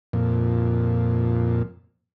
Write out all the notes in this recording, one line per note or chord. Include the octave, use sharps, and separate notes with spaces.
F2 A#2